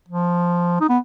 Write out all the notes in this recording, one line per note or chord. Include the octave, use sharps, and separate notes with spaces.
F3
D#4
B3